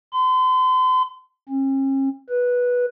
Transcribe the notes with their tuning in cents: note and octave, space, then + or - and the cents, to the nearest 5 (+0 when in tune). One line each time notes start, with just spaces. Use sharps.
C6 -40
C#4 -45
B4 -10